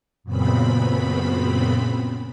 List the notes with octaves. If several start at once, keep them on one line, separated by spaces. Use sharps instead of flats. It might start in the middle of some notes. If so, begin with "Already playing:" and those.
F#2 A#2 C#3 B3 C4 B5